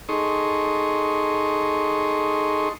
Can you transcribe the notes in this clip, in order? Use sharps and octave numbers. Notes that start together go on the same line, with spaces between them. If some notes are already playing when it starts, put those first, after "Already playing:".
D#4 G#4 A4 C6 C#6 D#6